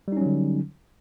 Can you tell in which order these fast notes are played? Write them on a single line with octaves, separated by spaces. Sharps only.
G3 D#4 C#4 F#3 D3